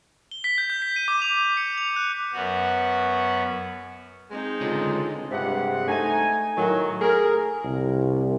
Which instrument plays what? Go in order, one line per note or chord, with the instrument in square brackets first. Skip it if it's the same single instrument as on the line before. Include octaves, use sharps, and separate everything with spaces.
[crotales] G7
B6
G6
G6
B6
D#7
D6
F7
C#7
F7
F#6
[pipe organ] F#2 B3 F#4
[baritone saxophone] G#3 [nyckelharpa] C4 D#4
[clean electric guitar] C#2 D3 [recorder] F4
[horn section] G2 C3 G#3 F#5
A3 D#4 G#5
A2 D#3 F#3
A3 G#4 A#4
[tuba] C2